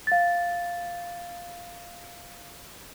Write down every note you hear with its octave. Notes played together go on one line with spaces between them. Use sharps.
F5 A6